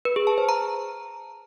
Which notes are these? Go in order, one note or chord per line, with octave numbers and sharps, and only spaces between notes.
B4
G#4
A5
C5
A#5